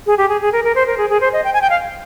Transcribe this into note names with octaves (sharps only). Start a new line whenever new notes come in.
G#4
G4
G#4
G#4
A#4
A#4
C5
A#4
G#4
G#4
C5
D#5
G5
G#5
G5
F5